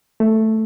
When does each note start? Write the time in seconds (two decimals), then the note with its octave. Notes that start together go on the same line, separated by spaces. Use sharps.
0.20 A3